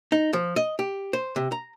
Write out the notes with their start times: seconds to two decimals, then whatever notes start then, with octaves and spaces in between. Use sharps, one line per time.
0.12 D#4
0.33 F3
0.56 D#5
0.79 G4
1.13 C5
1.36 C3
1.52 A#5